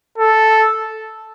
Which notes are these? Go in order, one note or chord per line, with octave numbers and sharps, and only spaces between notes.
A4